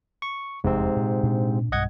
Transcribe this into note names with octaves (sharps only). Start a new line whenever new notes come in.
C#6
F1 E2 G#2 C3 C4
A#2
A#2 D4
B1 G2 D#5 F#5 G#6